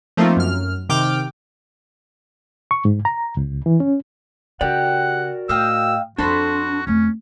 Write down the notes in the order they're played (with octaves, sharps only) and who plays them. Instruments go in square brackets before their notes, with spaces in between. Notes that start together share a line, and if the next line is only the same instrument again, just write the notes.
[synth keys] F3 A3 A#3 C4 D#4 F4
F#2 F6
C3 D#3 G5 D6 F6
[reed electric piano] C#6
G#2
A#5
C#2
E3
C#4
[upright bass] C#3 [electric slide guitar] F#4 A#4 D5 [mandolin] G4 [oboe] F#5
[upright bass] A2 [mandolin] D#5 F5 G5 [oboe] E6
[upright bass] F2 [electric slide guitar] D4 [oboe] F#4 [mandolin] A4 C5 B5
[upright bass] F2 A3 [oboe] C#4